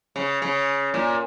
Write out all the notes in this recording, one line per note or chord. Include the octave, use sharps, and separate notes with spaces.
C#3
C#3
A#2